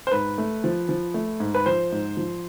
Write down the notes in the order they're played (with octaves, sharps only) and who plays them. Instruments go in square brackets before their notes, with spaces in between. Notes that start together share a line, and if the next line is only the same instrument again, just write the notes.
[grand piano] C5
G#2 B4
A3
F3
F3
A3
G#2
B4
F3 C5
G#2
F3